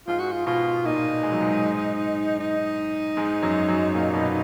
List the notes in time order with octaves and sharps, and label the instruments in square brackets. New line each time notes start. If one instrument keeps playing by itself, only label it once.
[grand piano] G#2 G#3 [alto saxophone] F4
[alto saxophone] F#4
F4
[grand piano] B2 B3 [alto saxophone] F4
[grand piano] A#2 A#3 [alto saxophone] D#4
[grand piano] G#3
F#3
G#2 G#3
[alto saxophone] D#4
[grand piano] G#2 G#3
F#2 F#3
F#2 F#3
A#2 A#3
B2 B3